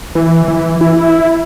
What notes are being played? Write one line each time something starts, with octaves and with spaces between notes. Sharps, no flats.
E3
E3
E4